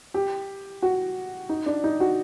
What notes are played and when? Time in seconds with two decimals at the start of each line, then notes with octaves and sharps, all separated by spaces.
0.14 G4
0.82 F#4
1.49 D#4
1.66 D4
1.84 D#4
2.00 F#4